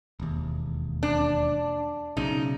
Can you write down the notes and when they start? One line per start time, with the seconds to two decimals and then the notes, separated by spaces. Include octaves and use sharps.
0.20 E1 D#2
1.03 D4
2.17 B1 C#3 D#4